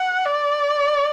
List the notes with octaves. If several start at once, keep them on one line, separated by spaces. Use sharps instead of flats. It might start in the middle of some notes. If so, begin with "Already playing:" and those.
Already playing: F#5
D5